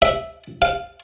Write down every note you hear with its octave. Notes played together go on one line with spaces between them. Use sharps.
E5
F5